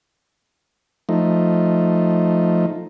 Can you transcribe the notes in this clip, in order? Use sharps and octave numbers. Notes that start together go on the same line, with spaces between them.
F3 A3 D#4